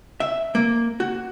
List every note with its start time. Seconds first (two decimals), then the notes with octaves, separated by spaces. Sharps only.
0.20 E5
0.55 A#3
1.00 F#4